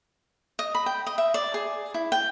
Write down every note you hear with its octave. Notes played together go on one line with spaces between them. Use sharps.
D#5
B5
G5
D#5
E5
D5
G#4
E4
G5